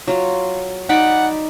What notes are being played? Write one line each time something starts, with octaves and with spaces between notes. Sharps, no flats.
F#3 F4
D#4 D5 F#5 B5